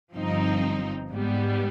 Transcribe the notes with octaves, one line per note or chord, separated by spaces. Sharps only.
G1 G2 F3 C4 D#4
G#2 G3 B3